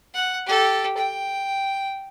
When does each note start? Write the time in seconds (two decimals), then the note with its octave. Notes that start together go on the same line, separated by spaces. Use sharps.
0.14 F#5
0.46 G4 A4
0.97 G5